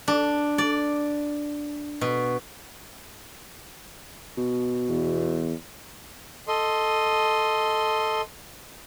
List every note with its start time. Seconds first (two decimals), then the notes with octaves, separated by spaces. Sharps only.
0.08 D4
0.58 D5
2.01 B2
4.37 B2
4.89 E2
6.48 A4 D#5 C6